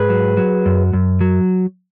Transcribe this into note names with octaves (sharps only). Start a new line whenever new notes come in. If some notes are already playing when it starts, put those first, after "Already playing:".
Already playing: G#2 G#4 B4
F#3
F#3
F#2
F#2
F#3